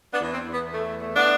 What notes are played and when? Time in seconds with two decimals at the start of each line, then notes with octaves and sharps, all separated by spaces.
0.13 B3 D4
0.21 E2
0.34 C4
0.47 E2
0.54 B3
0.74 A3
1.01 A3
1.15 B3 D4